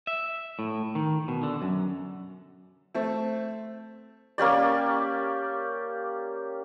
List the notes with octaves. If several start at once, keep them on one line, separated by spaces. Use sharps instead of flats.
E5
A2
D#3
B2
D3
F#2
A3 C4
A#3 C#4 G4 D5